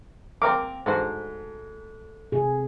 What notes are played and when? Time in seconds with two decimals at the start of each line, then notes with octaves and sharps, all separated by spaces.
0.42 A#3 C4 A#4 D6
0.86 G#2 D4 F#4 A4 C5
2.32 C3 G#4